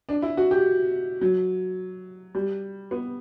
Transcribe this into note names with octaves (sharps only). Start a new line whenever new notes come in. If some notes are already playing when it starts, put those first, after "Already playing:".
D4
E4
F#4
G4
F#3
G3
B3